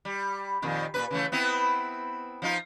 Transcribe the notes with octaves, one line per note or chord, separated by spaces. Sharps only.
G3
F2 A#2 D#3
A#2 C#3 B4
C#3 E3 A3
B3 C4 E4
F3 D#4 F4